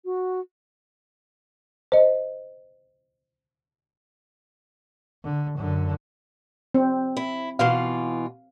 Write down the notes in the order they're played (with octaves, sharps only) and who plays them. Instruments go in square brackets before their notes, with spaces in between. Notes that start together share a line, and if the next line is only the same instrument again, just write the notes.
[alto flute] F#4
[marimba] C5 D#5
[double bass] D3
F#2 D3
[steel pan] C4
[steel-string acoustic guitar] E4
[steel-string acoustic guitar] B2 E3 F4 [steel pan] F5